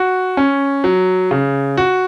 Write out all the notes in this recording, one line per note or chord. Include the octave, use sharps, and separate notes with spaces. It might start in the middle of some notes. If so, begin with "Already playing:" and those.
Already playing: F#4
C#4
F#3
C#3
F#4